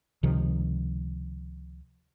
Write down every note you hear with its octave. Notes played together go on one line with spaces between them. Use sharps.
C#2 C3 D#3 F3